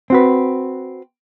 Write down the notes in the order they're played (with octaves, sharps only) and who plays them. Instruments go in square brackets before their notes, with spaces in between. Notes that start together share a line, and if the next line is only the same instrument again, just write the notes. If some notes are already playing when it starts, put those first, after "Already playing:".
[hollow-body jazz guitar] C4 F#4 B4